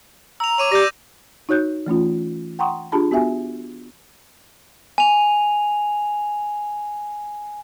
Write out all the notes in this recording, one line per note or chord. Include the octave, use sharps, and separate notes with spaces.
A#5 E6 F7
C#5 D6 D#7 F7
G4 D5 G6 A#6
D#4 F#4 C#5 F#6 G6
E3 A3 C#4 F4
F#5 G5 A#5 C6 C#6 D#6
D4 F4 G4 G#4 A5 B5
B3 F#4 G4 E5 G#5
G#5 F7